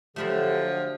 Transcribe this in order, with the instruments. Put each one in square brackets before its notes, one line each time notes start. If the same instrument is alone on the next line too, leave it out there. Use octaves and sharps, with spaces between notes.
[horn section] D3 F3 [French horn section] F#3 G4 [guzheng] A3 E5 B5